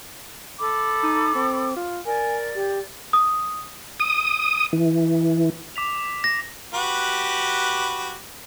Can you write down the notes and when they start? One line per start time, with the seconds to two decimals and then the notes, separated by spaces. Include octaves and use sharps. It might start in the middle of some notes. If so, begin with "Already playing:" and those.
0.59 A4 B5 D6
1.03 D#4
1.35 C4
1.76 F4
2.06 A#4 D5 G#5
2.55 G4
3.13 D#6
4.00 D#6
4.73 E3
5.76 D6 B6 F7
6.24 A#6
6.74 F#4 G4 B4